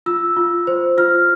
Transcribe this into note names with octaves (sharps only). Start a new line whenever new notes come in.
F4 E6
F4
C5
F4 F6